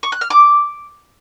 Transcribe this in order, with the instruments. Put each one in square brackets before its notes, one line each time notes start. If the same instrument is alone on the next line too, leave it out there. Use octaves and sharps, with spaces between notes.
[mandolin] C#6
F#6
F6
D6